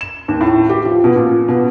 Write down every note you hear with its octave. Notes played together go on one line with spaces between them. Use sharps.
E7
D#2
A2
G4
F3
B2
A#2
B2